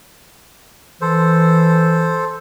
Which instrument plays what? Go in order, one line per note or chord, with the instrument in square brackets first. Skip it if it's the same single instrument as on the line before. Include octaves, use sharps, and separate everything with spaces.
[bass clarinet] E3 [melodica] A4 C5